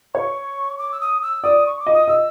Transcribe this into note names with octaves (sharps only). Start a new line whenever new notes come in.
C#5 C#6
D6
E6
D#6
E6
D5 D#6
C#6
D6
D#5
D#6
D#5 E6